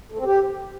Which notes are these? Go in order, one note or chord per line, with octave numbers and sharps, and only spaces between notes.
A3
C4
G4